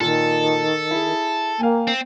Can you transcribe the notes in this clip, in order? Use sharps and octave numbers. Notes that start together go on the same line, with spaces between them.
A#2 D#3 A4
E4 G#4
A#3 F5 G5 G#5
C4